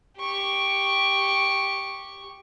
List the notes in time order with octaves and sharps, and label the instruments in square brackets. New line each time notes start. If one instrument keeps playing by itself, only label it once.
[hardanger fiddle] G4 C#6